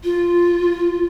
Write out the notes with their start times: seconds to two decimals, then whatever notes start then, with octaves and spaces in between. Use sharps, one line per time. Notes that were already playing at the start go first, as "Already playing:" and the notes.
0.04 F4